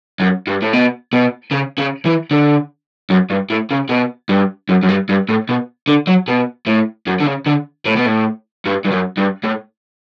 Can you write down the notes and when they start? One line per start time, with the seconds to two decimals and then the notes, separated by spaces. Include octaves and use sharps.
0.20 F#2
0.47 G2
0.62 A2
0.73 B2
1.13 B2
1.52 C#3
1.78 C#3
2.05 E3
2.31 D3
3.10 F#2
3.30 G2
3.50 A2
3.71 C#3
3.89 B2
4.29 G2
4.69 F#2
4.83 F#2
4.89 G2
5.09 G2
5.29 A2
5.49 B2
5.88 D3
6.07 F#3
6.28 B2
6.67 A2
7.07 F#2
7.20 D3
7.26 C#3
7.46 D3
7.86 A2
7.96 B2
8.06 A2
8.66 G2
8.85 G2
8.92 F#2
9.18 G2
9.44 A2